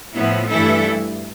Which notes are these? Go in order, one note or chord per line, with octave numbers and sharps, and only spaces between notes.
A2 F3 B3 E4
G2 E3 A3 E4 A4